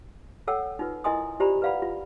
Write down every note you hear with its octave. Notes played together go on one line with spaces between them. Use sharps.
A4 C#5 F#5 G5 E6
D#4 F4 B4
E4 A#4 D#5 G#5 C6 D#6
F4 G4 C5 D5 A#5 B5
B4 D5 F5 F#5 B5
F4